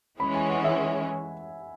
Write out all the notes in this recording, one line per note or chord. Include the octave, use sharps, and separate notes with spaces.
E3 G#3 C#4 B5
G#5
F#5
E5